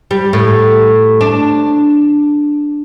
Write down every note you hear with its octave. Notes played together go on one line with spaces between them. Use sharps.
G3
A2
D4